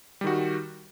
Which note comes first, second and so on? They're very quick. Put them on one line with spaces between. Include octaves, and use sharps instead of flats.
G3 D#3 F#4